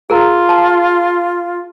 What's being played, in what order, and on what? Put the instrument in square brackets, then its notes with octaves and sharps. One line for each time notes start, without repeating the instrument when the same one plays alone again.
[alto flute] F4 [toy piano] G#4 A#4 A#5
[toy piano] A5